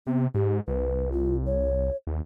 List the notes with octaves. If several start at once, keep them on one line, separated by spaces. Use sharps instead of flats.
C3 B3
G#2 G4
C2 B4
F4
C#5
D#2